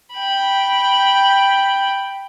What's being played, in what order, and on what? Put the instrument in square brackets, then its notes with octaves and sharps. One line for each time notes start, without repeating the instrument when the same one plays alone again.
[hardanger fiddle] G5 B5